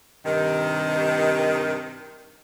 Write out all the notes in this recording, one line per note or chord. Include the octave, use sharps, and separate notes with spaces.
G2 C3 D#3